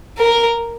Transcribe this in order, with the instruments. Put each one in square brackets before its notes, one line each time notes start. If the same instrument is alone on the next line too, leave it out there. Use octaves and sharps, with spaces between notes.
[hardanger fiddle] A#4